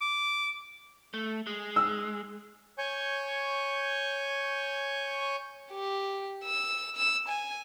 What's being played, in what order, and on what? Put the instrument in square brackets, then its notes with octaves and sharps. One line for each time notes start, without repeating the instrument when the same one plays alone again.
[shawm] D6
[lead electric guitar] A3
G#3
[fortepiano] E6
[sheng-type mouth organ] C#5 G#5 C#6 G6
[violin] G4
E6
E6
G#5